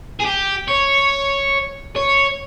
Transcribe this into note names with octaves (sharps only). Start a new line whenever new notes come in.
G#4
G4
C#5
C#5